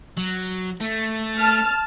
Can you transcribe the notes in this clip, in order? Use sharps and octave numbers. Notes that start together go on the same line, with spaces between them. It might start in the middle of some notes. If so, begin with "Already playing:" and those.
F#3
A3
A5 F6